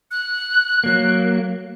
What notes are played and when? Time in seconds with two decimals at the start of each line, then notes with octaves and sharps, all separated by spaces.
0.11 F#6
0.84 F#3 A#3